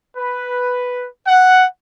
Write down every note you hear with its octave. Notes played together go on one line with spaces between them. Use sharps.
B4
F#5